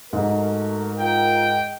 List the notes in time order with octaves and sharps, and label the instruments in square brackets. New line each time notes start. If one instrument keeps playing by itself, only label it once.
[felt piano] G#2 [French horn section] A3 F#4 A#4
[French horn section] F4 A#4 [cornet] G5